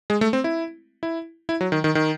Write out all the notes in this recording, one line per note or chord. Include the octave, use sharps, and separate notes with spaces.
G#3
A3
C4
E4
E4
E4
F#3
D#3
D#3
D#3